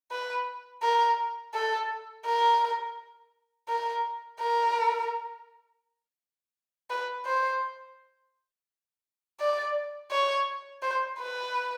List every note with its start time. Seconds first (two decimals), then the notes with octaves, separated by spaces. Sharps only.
0.11 B4
0.82 A#4
1.54 A4
2.26 A#4
3.68 A#4
4.40 A#4
6.90 B4
7.26 C5
9.40 D5
10.11 C#5
10.82 C5
11.19 B4